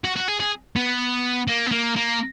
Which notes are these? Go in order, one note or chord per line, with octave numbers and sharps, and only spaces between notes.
F#4
F#4
G#4
G#4
B3
A#3
B3
A#3
A#3